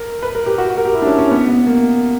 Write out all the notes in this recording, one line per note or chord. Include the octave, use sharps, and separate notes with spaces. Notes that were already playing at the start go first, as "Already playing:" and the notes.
Already playing: A#4
B4
A#4
G4
F#4
A#4
G4
E4
D4
C#4
C#4
B3
B3
A#3